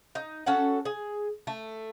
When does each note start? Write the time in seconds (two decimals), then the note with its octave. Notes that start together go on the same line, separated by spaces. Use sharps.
0.15 D#4
0.46 C#4 F#4 A4 F#5
0.85 G#4
1.47 A3